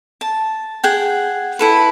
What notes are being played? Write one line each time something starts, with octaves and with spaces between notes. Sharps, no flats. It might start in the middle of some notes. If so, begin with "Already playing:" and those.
A5
G#4 F#5 G5
E4 A4 B4